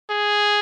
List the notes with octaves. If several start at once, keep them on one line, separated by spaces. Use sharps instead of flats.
G#4